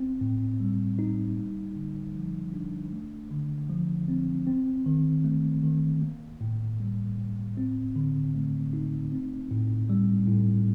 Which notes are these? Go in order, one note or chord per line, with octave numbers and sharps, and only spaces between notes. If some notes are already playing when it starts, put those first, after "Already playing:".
Already playing: C4
A2
G3
D#4
A#3
D3
F3
D4
A3
D3
F3
C4
C4
D#3
A3
D#3
A#3
A2
G3
A2
C4
D3
A3
D#4
C4
A2
G3
A2